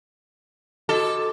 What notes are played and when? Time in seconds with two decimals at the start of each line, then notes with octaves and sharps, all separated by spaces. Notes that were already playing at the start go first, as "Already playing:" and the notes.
0.89 F#4 A4 D#5 D6